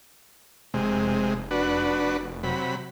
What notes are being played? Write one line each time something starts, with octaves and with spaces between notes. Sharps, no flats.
F1 C3 G#3
D4 F#4 B4
C3 F#3 B5